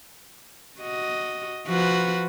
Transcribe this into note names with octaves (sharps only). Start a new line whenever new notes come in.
F#4 D#5
F3 F#4 B4